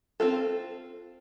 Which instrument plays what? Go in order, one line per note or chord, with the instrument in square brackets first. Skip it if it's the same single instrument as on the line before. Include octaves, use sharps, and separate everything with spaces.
[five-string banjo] C4 F4 A4